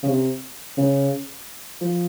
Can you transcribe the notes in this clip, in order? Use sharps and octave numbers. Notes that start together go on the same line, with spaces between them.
C#3
C3
C#3
F3